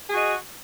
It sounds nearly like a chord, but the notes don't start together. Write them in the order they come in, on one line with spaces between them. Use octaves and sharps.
G#4 F#4 D#5